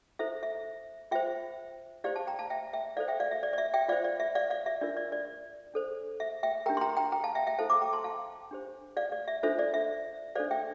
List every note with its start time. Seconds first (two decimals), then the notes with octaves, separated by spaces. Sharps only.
0.19 E4 A4 C5 E5
0.43 E5
1.11 F4 C5 E5 G5
2.04 E4 G4 C5 D5 F5
2.16 F5 A5
2.27 G5 A#5
2.39 F5 A5
2.50 E5 G5
2.73 E5 G5
2.97 E4 A4 C5 D5 F5
3.08 E5 G5
3.20 D5 F5
3.31 E5
3.43 D5
3.53 D5
3.58 E5
3.74 E5 G5
3.88 F4 C5 D5 F5
4.04 D5
4.20 E5
4.35 D5 F5
4.50 D5 F5
4.66 E5
4.81 D4 F4 A#4 D5
4.97 D5
5.12 D5
5.74 D4 A4 C5
6.20 E5
6.43 E5 G5
6.66 D4 G4 A#4 G5 A#5
6.77 C6
6.81 G5 A#5
6.97 G5 A#5
7.12 G5 A#5
7.24 F5 A5
7.35 E5 G5
7.47 E5 G5
7.59 E4 A4 C5 F5 A5
7.70 A#5 D6
7.81 G5 A#5
7.93 A5 C6
8.04 F5 A5
8.51 D4 G4 C5
8.97 D5 F5
9.12 D5
9.28 E5
9.43 D4 F4 A4 C5 E5
9.59 D5
9.74 E5
10.35 D4 A4 C5 D5 F5
10.51 E5 G5